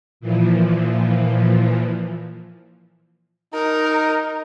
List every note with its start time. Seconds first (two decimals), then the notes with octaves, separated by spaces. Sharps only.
0.20 A#2 E3 F3
3.54 D#4 A#4